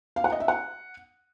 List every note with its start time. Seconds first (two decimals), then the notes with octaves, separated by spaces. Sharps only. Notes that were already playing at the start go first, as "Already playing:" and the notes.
0.16 F5
0.24 F#5
0.32 D#5
0.40 E5
0.48 F#5